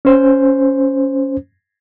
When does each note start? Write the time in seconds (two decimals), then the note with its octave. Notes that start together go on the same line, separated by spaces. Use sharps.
0.05 C#4 C5